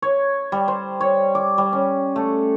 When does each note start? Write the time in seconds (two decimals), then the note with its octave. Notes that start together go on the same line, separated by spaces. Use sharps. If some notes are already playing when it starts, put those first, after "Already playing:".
0.02 C#5
0.52 G3
0.68 C5
1.01 C#5
1.35 D6
1.58 G3
1.73 C#4
2.16 A3